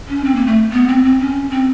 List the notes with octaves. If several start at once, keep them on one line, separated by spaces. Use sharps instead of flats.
C#4
C4
A#3
A3
B3
C4
C4
C#4
C4